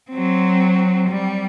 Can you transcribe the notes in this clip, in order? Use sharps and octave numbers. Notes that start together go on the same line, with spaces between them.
F#3 C4
G3